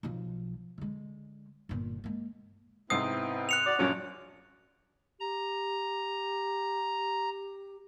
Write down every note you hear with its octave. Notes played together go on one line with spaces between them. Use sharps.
B1 F3
D3 G#3
G1 A#2
G#3 A#3
G#2 C3 B3 C4 E4 D#6 C7
F#6 C#7 F7
F#4 D5
A#1 F#2 C#4
G4 A#5